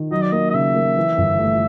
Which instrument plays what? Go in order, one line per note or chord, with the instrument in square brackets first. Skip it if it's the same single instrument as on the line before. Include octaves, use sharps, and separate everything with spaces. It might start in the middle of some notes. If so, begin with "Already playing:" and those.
Already playing: [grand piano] D#3
[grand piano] F#3 [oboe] D#5
[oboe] D5
[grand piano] A#3 [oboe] D#5
[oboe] D#5
[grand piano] C#3 [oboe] E5
[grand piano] A#3
E3
G1
A3